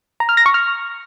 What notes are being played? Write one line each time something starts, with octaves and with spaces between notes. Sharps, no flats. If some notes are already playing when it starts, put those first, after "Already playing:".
A#5
F6
A#6
C#6
F6